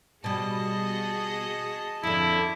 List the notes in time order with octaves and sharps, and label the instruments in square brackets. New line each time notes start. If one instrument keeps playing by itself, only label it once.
[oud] B2 G3 [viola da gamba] F#4 G#4 D#5 [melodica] A5
[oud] F2 D3 [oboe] E4